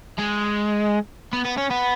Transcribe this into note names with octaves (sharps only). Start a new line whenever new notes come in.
G#3
B3
B3
C#4
B3